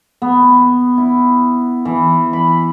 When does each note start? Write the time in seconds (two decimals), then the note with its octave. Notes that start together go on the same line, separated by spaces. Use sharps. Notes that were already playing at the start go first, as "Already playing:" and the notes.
0.22 B3
0.98 E4
1.85 E3
2.33 B5